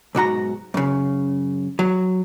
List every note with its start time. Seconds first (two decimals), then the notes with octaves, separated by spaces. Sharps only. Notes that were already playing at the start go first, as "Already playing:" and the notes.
0.15 B1 G#2 F#4 A#5
0.74 F#2 C#3
1.79 F#3